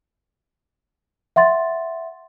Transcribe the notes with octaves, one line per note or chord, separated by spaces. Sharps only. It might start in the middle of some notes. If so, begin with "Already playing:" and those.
E5 F#5 C6 A6